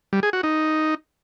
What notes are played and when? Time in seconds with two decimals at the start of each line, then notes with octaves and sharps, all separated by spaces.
0.13 G3
0.23 G#4
0.33 F#4
0.43 D#4